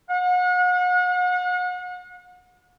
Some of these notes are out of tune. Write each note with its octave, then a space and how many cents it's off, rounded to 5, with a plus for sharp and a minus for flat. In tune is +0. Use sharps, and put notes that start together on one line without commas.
F#5 -40